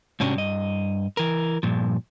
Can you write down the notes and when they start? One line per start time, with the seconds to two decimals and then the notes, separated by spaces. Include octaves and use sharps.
0.20 G#2 C3 C#4 D4 F#4 G4
0.35 G2 D#5
1.17 E3 A#4
1.63 G2 A#2 F3